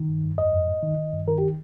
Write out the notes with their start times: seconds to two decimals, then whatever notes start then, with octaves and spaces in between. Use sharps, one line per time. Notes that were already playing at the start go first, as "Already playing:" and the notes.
Already playing: D#3
0.09 G2
0.24 G2
0.38 F2 D#5
0.54 F2
0.68 G#2
0.83 D#3
0.97 D#3
1.13 G2
1.27 D#3 A#4
1.38 G4